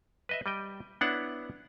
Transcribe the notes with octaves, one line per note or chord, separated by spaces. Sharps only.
B4 D#5 E5
G3 D#5 G5
B3 D4 E4 C#5 F#5